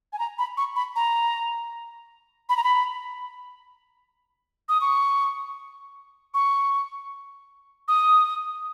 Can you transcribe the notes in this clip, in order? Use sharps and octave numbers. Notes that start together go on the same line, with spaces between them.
G#5
A#5
B5
C#6
B5
A#5
B5
A#5
B5
D#6
C#6
C#6
D#6